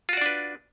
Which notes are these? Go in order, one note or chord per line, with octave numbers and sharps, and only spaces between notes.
D4 F4 F#4 B4 D5